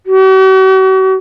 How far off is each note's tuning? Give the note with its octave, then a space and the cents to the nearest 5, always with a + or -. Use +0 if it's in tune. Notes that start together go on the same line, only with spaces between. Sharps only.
F#4 +45